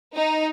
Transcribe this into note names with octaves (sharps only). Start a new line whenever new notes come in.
D#4